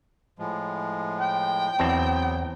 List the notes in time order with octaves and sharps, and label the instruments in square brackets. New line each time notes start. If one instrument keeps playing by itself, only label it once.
[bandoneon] A2 F3 G#3
[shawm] G5
[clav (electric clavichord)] E2 C4 A5 [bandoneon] F#3 B3